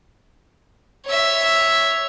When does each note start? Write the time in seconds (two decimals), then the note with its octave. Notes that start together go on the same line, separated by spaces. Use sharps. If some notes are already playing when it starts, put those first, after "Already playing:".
1.05 C#5 E5